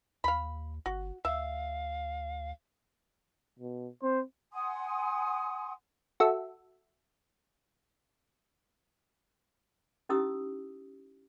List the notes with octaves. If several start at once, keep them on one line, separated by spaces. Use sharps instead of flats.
D#2 F5 B5
G1 F#4
D2 E5 F5
B2
C4 C5
F#5 G#5 C6 D#6
F#4 A4 E5
C#4 D#4 E4 G4 D#6 E6